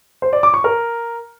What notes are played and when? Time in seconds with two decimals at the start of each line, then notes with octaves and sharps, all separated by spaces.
0.22 C5
0.33 D5
0.43 D6
0.54 C#6
0.64 A#4